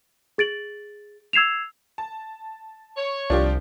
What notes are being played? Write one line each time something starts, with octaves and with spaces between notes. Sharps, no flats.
G#4 A6 D7 F#7
E6 G#6 C7 E7 F7
A5
C#5
C2 F3 D4 F4 G4